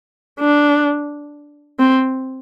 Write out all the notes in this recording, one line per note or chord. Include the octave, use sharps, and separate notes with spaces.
D4
C4